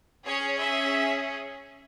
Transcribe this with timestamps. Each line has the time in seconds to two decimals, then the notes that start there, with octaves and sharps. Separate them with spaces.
0.25 C#4 G#4 C#5
0.60 E5